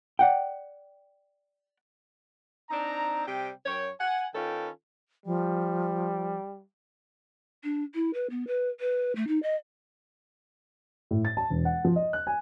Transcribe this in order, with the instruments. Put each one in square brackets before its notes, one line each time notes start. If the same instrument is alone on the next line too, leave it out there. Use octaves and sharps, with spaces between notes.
[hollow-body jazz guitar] D5 F#5 G5
[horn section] C4 D4 D#4 A#5
C3 G3 C4 G5
F#2 C#5 G5
F#5 G#5
D#3 C#4 F4 A4 B4 G5
[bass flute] F3 [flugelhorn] G3
[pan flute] D4
E4
B4
B3
B4
B4
A3
D#4
D#5
[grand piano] A2
A6
A5
E1
F#5
F3
D#5
F#6
G#5